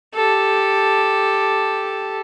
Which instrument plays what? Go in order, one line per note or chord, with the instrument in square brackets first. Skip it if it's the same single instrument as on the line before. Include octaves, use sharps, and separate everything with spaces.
[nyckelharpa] G4 A4